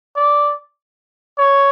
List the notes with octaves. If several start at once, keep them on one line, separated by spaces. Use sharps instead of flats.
D5
C#5